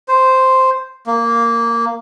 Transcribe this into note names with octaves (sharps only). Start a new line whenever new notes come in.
C5
A#3